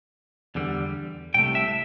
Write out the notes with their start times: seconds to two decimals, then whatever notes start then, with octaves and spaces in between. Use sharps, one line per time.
0.55 E2 D3 G3
1.34 C2 C3 A3 G5
1.55 E5